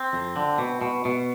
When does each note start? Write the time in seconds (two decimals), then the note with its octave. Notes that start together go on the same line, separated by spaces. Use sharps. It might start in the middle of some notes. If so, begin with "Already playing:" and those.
Already playing: C4
0.13 F2
0.36 D3
0.58 B2
0.81 B2
1.05 B2